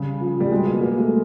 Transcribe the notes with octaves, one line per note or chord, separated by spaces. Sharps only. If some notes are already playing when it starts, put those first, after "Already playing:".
Already playing: C#3 G3
F3
G3
B2 G#3
A#3
F#3 A#3
A3